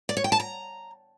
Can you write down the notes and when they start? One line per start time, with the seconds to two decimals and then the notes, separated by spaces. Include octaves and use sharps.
0.09 D5
0.17 C#5
0.24 G5
0.32 A5
0.40 A#5